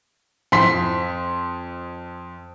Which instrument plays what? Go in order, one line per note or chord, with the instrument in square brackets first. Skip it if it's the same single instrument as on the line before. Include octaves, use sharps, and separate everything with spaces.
[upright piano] F2 C6 B6